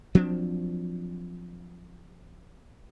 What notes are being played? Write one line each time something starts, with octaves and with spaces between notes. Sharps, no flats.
F3 F#3 C4 D4